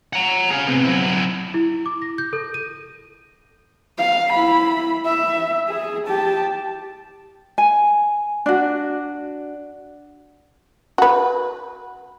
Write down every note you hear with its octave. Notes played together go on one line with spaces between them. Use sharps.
F#5 A#5
G#4 F5
C3 B3
F#3 E4
E4
D6
A#6
G6
A4
D#7
F5
E4 B5
E5
G#4
G4 A5
G#5
D4 F#4
F#4 B4